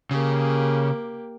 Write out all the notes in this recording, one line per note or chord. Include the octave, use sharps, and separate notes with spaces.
C#3 A#3 G4